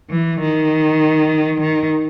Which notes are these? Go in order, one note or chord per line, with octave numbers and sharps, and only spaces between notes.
E3
D#3
D#3